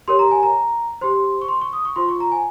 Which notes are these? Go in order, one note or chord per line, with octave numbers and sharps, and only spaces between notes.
G4 A#4 C#5 C6
A#5
G#5
A#5
G4 C5 C6
C#6
C6
C#6
D#6
C#6
F4 C5 C6
C#6
A#5
G#5